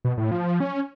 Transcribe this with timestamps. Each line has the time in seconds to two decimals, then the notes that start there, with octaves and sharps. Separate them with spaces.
0.05 B2
0.17 A2
0.31 F3
0.60 C#4